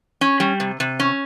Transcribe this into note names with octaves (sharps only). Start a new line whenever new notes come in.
C#4
G3
C3
C3
C#4